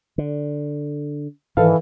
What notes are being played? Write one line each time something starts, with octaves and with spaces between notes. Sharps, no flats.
D3
G#2 D#3 E3 A4 B4 F5